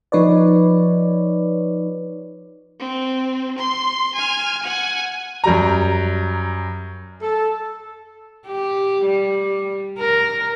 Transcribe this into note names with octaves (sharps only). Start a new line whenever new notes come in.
F3 D#4 B4 C#5 D5
C4
C6
G#5 F6
F#5 G#5
F#2 G3 A#5
A4
G4
G3
A#4